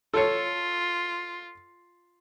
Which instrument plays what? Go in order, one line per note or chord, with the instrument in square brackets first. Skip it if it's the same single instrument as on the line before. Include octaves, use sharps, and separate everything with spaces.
[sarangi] F4 [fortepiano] A4 C#5